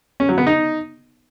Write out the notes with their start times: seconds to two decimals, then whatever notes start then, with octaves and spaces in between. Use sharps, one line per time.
0.20 C#4
0.29 F#3
0.38 B3
0.47 D#4